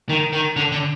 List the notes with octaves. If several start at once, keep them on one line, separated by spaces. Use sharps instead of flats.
D#3
D#3
D3
D3